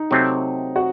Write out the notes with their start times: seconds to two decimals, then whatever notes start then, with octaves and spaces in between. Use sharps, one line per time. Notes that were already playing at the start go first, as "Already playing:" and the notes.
Already playing: D#4
0.11 C3 F#3 A3 C4
0.76 F#4